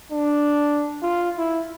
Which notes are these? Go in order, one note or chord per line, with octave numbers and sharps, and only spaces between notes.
D4
F4
E4